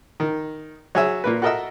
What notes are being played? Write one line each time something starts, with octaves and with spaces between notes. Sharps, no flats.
D#3
F#3 G#4 E5
A#2 A#3 B4
F#4 A4 A#4 D#5 E5 E6